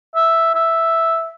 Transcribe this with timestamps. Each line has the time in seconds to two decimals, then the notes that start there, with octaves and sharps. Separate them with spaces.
0.15 E5
0.55 E5